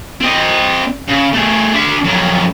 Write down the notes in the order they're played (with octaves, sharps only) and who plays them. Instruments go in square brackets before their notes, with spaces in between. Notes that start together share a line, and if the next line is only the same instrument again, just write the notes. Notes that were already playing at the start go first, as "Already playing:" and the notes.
[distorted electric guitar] C4 D#5
C#3
A3 G#4
D4 E5
F2 F#3